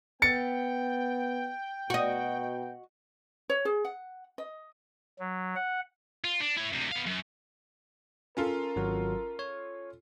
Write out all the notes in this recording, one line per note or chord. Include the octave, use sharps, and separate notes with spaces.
B3 G5 A6 C#7
B2 F#4 D#5
C#5
G#4
F#5
D#5
F#3
F#5
F4
D4
E4 C#5
D2 C3
B3 F5
F#2
C#4 F4 A4 A#4
G#1 F#3 F#4
C#5